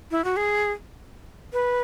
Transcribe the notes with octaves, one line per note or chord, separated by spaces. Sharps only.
E4
F#4
G#4
B4